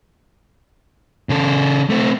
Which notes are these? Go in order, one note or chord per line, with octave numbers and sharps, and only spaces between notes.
C#3 A4
A3 C4